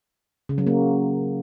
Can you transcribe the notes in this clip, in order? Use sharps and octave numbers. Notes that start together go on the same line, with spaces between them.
C#3
F#3
A#3